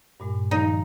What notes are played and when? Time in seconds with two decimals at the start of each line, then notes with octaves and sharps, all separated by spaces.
0.20 G2 A#2 G#3
0.51 D#3 F3 G3 D#4